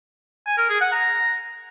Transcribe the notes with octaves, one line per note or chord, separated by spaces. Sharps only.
G#5
A#4
G#4
F#5
A#5